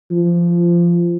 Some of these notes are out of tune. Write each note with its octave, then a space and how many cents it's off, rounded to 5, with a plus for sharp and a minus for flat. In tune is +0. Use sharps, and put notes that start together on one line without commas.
F3 -20